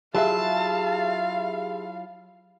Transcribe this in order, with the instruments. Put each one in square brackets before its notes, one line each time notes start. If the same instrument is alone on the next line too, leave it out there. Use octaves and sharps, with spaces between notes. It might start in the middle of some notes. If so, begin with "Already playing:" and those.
[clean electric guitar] F#3 E4 F4 [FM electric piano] G4 G#4 E5 [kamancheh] F5 [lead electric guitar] A5